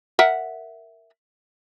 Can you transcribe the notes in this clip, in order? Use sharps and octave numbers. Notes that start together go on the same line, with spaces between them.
A#4 E5 F#5